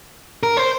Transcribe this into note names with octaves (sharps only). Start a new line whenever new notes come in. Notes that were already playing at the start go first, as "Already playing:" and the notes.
A#4
C5